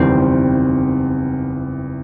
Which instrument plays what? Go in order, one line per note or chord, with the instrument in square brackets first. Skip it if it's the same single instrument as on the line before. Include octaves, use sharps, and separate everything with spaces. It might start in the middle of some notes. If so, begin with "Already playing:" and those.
Already playing: [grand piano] F#1 E2 D#3 G3 [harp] C4